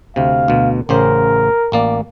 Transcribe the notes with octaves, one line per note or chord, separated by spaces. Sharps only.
D2 C3 F5
D2 B2
A1 C#3 A#4 C5
A1 A#3 D5